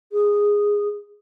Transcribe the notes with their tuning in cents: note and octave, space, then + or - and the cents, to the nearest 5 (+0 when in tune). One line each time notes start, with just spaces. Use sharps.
G#4 -10